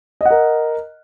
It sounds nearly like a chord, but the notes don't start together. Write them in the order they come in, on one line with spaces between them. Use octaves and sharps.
D#5 F#5 A#4